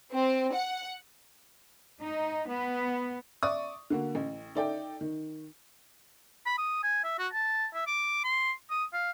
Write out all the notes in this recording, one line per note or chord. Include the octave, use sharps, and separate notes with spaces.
C4
F#5
D#4
B3
D5 E5 C#6 D#6
D3 A#3 F#4
A1
D#4 A4 D5 E5 G5
D#3
B5
D#6
G#5
E5
F#4
A5
E5
D6
C6
D#6
F5